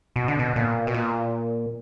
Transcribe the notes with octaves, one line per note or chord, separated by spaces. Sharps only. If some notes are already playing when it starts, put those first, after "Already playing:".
B2
D3
B2
A#2
B2
A#2